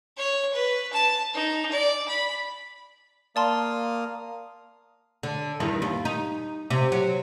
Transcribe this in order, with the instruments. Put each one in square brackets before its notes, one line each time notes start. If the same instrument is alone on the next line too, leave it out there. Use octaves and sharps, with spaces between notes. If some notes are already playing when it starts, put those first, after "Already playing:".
[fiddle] C#5
B4
A5
D#4
D5
B5
[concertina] A#3 F5 D#6 [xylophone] D5 A5 C6
[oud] D3
E2 G2 D#3
D#2
D#4
C3
F#3